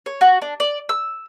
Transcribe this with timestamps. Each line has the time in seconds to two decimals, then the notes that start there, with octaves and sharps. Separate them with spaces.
0.06 C#5
0.21 F#4
0.42 D4
0.60 D5
0.89 E6